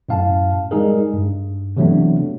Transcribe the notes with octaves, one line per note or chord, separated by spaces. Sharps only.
F#2 A2 F5 A5
G3 G#3 D#4 G#4 A#4
G2
C3 E3 F#3 A3 B3 D4